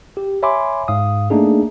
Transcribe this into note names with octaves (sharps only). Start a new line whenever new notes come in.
G4
C#5 E5 G#5 B5 C6 D6
G#2 F5 D#6
A3 A#3 D4 D#4 G#4